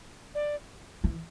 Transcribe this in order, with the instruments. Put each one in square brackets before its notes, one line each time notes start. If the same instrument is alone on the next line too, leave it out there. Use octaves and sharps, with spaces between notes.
[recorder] D5
[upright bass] E3